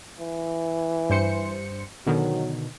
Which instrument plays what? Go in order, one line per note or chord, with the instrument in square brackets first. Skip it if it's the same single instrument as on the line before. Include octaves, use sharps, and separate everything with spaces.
[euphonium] E3
[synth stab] G2 C5 C#7
[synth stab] B2 D3 D#3 [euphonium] F#3